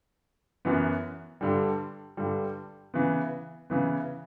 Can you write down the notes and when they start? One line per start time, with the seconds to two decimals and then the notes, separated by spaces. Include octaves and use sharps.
0.65 F#2 E3 B3
1.41 G2 D3 G3
2.17 G2 D3 G3
2.94 C#3 E3 B3
3.70 C#3 E3 B3